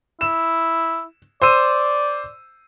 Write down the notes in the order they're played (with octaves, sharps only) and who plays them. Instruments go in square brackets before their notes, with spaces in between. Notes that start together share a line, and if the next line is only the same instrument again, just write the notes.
[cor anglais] E4 [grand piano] E7
[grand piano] C5 E6 D#7 [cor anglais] D5